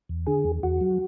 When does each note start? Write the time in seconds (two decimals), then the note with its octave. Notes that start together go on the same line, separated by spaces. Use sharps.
0.09 E2
0.27 D3 G#4
0.45 E2
0.63 E2 F#4
0.81 F#3